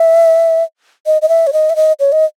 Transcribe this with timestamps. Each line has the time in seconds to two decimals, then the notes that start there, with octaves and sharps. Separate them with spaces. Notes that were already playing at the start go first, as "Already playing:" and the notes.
Already playing: E5
1.06 D#5
1.22 D#5
1.29 E5
1.47 C#5
1.53 D#5
1.70 E5
1.76 D#5
2.00 C#5
2.12 D#5